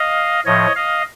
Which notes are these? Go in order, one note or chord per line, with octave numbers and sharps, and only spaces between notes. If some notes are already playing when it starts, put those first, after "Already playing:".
Already playing: D#5 F5
A2 F3 C#5 D#5
D#5 F5